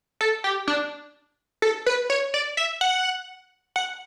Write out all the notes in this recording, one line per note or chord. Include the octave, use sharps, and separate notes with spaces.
A4
G4
D4
A4
B4
C#5
D5
E5
F#5
F#5